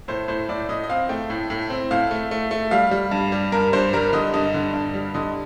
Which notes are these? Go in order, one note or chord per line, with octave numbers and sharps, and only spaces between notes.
A2 C5
A2 C5
A2 D5
A2 D#5
D#5
C4 F5
A3 G5
A2
A2
C4
A2 F5
A3
A3
A3
G3 F5
G3
G2
G3
G2 A#4
G2 C5
G3 A#4
D3 D#5
G2 D#5
D3
G2
G3
D3 D#5